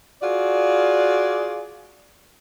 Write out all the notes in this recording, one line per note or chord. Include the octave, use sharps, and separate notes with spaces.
F4 F#4 G#4 D5